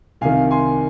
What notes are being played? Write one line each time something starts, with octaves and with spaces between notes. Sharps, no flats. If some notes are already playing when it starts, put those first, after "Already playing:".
C2 C3 D#3 F5 G#5
G#5 C6